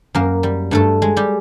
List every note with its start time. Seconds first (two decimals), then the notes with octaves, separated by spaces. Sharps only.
0.15 F#2 A#3 A#4
0.43 G3
0.71 G2 A3 A4
1.02 G#3
1.17 G3 G4